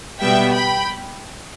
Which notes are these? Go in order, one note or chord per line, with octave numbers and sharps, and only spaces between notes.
B2 G3 B3 E5 G5
G5 B5